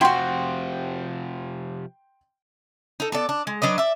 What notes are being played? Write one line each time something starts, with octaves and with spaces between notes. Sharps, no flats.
C3 F3 E4 F#4 G5 C6
D#4 A4
B3 A4 D5
D4
G#3
F#3 D4 B4 D#5
D5 E5